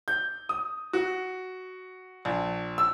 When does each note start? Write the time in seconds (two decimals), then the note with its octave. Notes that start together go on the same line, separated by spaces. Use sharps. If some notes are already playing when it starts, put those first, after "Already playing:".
0.08 G6
0.49 D#6
0.93 F#4
2.25 A#1
2.78 E6